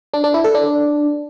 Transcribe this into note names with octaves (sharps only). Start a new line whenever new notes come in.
D4
D4
E4
A4
D4